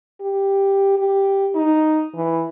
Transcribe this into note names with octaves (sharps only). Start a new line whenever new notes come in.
G4
G4
D#4
E3